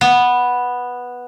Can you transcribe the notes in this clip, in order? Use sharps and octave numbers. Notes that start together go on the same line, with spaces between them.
B3